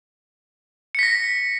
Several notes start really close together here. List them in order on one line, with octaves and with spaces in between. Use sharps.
C#7 B6 A#6